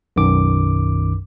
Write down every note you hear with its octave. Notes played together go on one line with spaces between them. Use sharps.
B1 F#2 D#3 D6